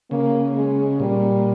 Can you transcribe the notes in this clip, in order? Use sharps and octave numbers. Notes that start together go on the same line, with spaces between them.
C#3 A#3
G#3
A#2 G3